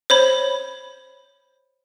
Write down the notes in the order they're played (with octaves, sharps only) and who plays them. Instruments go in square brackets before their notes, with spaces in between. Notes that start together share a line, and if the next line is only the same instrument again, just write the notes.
[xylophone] C5 C#5 B5